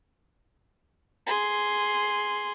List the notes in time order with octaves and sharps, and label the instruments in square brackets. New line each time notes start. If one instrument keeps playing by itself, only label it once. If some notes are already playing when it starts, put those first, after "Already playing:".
[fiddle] G#4 C6